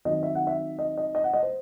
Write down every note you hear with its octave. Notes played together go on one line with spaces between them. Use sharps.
D#3 F#3 C4 D#5
E5
F#5
E5
D#5
D#5
D#5
F#5
D#5
C5